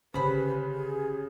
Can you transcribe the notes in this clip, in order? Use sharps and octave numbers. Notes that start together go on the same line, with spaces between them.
G1 C#3 G4 B4 C5 B5
G#4